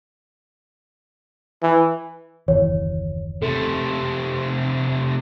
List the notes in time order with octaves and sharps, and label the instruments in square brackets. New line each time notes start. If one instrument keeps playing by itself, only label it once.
[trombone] E3
[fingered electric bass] F#1 D#2 E3 [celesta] C#5
[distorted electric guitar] C3 A3 [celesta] A4